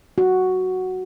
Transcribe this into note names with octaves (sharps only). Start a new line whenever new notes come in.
F#4